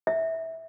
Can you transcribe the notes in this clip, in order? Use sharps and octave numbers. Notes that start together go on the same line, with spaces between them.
E5